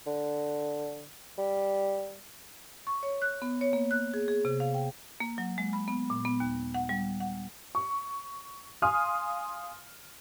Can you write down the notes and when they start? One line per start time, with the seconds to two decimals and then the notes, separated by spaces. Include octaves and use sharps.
0.07 D3
1.38 G3
2.87 C#6
3.03 C#5
3.22 F#6
3.42 B3
3.61 C#5
3.73 A#3
3.91 F#6
4.14 G#4
4.28 G#4
4.45 C3
4.60 F5
4.74 G5
5.20 A#3
5.38 F#3
5.58 G#3
5.73 B5
5.88 B3
6.10 A#2
6.25 B3
6.40 D#2
6.74 F#5
6.89 G3
7.20 F#5
7.75 C#6
8.82 F5 G#5 C6 D#6 F6